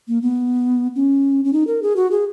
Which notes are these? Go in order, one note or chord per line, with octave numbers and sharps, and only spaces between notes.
A#3
B3
C#4
C#4
D#4
A#4
G#4
F#4
G#4